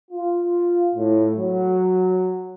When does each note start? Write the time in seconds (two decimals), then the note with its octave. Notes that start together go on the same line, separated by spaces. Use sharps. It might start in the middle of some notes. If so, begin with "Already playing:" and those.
0.11 F4
0.95 A2
1.35 F#3